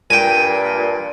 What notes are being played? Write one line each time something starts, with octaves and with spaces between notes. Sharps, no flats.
G2 A#2 G5 G#5